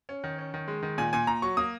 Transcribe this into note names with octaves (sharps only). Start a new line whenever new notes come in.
C#4
D#3
C#4
D#3
G#3
D#3
A#2 G#5
A#2 G#5
A#2 A#5
F#3 C#6
A#3 D#6